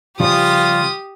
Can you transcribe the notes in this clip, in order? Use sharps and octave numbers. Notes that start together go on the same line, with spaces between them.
C#3 F3 G3 F4 G4 D#6